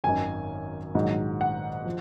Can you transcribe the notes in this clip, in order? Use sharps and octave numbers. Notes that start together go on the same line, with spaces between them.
G#1 F#2 D#3 G#5
A#1 G#2 D#3 F#3
F#5
F3